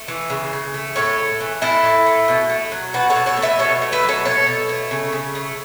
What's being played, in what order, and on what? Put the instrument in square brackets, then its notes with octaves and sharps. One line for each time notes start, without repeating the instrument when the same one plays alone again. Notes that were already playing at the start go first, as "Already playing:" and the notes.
Already playing: [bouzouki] A3
E3
C#3
C#3
A3
A2 A4 C#5
A3
E3
A2 E4 A4
A2
A3
B2
A3
F#3
B2 F#4 B4
A4 C#5
B2
A4 C#5
A3
B4 E5
B2 A4 C#5
A3
B4 E5
F#3
A4 C#5
B2 A4 C#5
B2
A3
C#3
C#3
A3